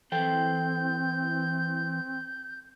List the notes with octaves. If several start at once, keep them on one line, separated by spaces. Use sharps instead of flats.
E3 C4 A4 C5 G5 G6